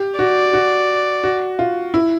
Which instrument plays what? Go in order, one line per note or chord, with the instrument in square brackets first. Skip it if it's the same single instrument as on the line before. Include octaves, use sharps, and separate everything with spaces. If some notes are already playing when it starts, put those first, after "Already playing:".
Already playing: [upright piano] G4
[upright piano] F#4 [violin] D5
[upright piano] F#4
F#4
F4
E4